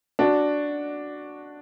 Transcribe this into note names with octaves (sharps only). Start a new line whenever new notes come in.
D4 F#4